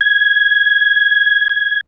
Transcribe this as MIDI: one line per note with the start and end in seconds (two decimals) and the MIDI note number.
0.01 1.48 92
1.49 1.81 92